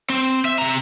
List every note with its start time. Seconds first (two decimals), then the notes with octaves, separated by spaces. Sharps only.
0.10 C4
0.45 E5
0.58 C3 A#5